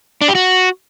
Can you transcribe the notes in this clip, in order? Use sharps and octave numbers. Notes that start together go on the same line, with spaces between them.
D4
G4
F#4